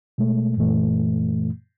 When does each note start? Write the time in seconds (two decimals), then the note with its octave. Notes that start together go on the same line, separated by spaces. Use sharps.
0.18 B2 G#3 A3
0.57 F#2 A#2 E3 A3